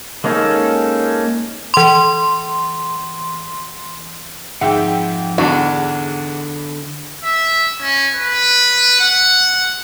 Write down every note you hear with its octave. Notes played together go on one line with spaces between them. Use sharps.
G#3 A#3 C#4 D#4 A4
E3 C6
F2 G#2 E5 F#5 G5
E2 D3 D4 F#4
E5
C#4
B4
F#5